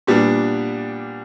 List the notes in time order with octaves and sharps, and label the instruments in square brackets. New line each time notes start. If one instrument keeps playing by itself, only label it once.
[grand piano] A#2 G3 B3 D4